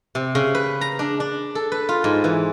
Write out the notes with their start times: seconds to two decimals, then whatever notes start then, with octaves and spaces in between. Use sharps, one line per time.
0.15 C3
0.35 C#3
0.55 B4
0.81 A#5
0.99 D4
1.20 D4
1.55 A4
1.72 B4
1.89 F4
2.04 G#2
2.24 E3